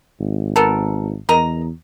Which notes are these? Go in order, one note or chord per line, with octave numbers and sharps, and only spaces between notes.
G#1
B3 A4 A#4
E2 A#4 D#5 A#5